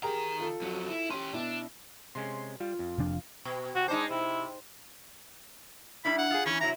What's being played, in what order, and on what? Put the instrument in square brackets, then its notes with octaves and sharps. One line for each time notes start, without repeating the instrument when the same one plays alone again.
[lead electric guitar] D#3 A#5 [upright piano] G4 G#4 A#4
[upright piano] F4 A4
[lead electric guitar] F2 F#3
E4
[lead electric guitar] C#4 G4 [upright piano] C6
[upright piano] B2 E4 [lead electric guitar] D4
[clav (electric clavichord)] C3 G#3 C#4 [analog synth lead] C6
[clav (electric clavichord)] G3 [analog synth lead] F4
[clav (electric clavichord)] F2
[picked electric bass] F1 F3 D4
[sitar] B2
[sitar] C3 [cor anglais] F#4
[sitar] G#3 D#4 C5 [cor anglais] D4
[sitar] C3 [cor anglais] E4
[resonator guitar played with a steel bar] G3 D4 E4 [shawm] B5
[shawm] F#5
[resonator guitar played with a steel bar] F4 G#4
[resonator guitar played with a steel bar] E3 [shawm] C#4
[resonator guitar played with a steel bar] C3 F#3 E4 [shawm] A#5